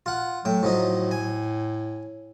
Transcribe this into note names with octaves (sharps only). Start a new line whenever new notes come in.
F4 F#5
A2 F#3 G5
A2 F3 F#3 D#4
G#5